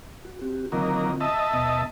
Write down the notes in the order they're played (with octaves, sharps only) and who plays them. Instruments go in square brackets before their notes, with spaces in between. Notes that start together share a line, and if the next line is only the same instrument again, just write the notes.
[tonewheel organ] F#4
C4 F#4 G4
[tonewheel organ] D3 C4 F4 [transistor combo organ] D#3 F#3 A#3
[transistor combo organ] D#5 E5 A5
[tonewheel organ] D#2 B2 B3